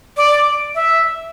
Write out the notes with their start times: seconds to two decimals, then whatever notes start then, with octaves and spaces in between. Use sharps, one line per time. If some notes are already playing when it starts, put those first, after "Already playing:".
0.17 D5
0.75 E5